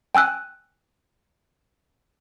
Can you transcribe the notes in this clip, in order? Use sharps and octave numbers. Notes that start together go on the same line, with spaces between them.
G5 G#5 E6 F#6